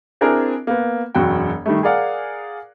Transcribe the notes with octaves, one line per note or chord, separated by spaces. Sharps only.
C4 D4 E4 G#4 A#4
A#3 B3
E1 F#2 F#4 G5
D#3 G3 A3
G#4 A#4 D5 F5 F#5